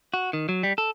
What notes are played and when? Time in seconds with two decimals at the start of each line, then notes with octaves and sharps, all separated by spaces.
0.14 F#4
0.33 D#3
0.49 F#3
0.63 G3
0.78 A4